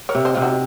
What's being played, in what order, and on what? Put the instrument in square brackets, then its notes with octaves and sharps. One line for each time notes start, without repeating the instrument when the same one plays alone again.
[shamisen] A#4 C#5
[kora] C3
[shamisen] C5 D#5
[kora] C3 [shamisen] F4
[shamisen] D#4 F#4